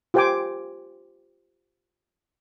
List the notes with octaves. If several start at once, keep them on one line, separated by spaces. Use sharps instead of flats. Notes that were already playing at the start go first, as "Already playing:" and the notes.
F4 G4 C5 G5 G#5 D6